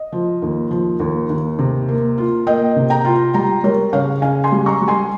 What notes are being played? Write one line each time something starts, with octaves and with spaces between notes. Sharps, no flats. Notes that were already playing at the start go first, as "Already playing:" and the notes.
Already playing: D#5
F3
D#2
F3
D#2
D#2
C3
A#3
F4
A#3 D#5 G5
C3
G5 A#5
F4
G3 G5 A#5
G3 A#4 C#5
C#3 C#5 F5
C#3 F5 G#5
G#5 C6
G3
A#5 C#6
G3
G#5 C6